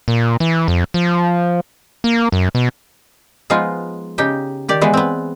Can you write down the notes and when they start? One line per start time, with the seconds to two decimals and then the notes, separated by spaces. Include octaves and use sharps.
0.08 A#2
0.40 E3
0.68 F2
0.94 F3
2.04 A#3
2.32 F#2
2.55 B2
3.50 F3 G#3 B3 D#4 F4
4.18 C#3 D#4 G4 G5
4.68 D#3 G4 D5
4.81 E3 G#3 B3
4.94 B3 C4